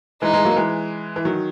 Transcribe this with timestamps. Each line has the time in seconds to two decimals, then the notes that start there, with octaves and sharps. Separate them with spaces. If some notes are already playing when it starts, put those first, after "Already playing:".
0.22 E3 G#3 D#4
0.34 E3 G#3
0.45 F#3 A#3
0.56 E3 G#3
1.16 E3
1.25 D#3 F#3